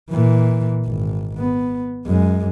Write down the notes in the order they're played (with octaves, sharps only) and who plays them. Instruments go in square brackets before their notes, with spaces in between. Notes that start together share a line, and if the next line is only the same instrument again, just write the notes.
[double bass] A#2 E3
G#1
B3
F#2 G#3